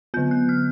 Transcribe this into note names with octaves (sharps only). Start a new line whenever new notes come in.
D3 F#3 B3 G6
F#6
F6